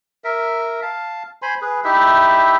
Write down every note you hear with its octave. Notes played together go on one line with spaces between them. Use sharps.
A#4 E5
F5 A5
C5 G#5 B5 C6
G#4 B4
D#4 E4 G4 E5